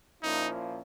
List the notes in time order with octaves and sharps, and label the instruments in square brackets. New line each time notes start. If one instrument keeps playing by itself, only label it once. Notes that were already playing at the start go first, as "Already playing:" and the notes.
[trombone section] A#2 F3 A#3 C#4 E4 [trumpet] D#4